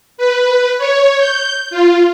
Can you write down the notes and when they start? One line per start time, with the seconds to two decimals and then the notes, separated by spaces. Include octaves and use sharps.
0.18 B4
0.78 C#5
1.18 G6
1.71 F4